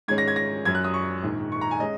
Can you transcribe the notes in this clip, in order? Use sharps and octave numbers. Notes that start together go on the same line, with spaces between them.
G#2 D#3 G#3 C#4 G#6
A#6
G#6
A#6
F#2 F#3 C#4 G#6
F#6
D#6
C#6
A#1 G#2 D#3
C#6
A#5
G#5
G#3 C#4 D#5